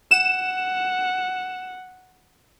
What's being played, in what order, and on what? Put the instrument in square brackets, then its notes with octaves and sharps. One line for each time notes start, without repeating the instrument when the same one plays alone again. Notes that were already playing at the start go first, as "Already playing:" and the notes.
[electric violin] F#5 [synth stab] E7